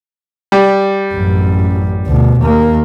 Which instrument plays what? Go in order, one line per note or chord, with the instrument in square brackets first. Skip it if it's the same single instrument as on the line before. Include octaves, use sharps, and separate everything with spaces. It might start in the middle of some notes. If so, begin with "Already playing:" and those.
[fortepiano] G3
[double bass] A1 F#2
D2 B2
D#2 A#3